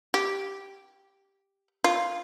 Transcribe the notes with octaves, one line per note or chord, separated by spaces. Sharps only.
G4
F4